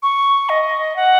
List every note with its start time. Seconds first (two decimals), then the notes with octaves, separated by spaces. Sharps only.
0.03 C#6
0.49 D#5
0.96 F#5